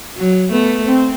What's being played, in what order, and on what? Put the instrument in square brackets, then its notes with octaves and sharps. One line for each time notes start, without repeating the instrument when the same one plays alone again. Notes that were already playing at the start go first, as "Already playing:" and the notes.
[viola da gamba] F#3
[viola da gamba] A3 [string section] B3
[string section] C4